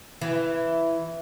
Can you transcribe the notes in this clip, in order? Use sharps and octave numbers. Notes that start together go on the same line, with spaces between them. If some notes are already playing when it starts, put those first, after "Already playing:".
E3